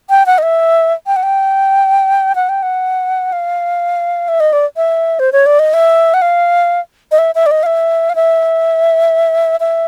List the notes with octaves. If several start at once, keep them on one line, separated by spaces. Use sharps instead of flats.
G5
F#5
D#5
E5
G5
F#5
G5
F#5
G5
F#5
F5
E5
D#5
D5
E5
C5
C#5
D5
D#5
E5
F#5
F5
D#5
E5
E5
D5
D#5
F5
E5
F5
E5
E5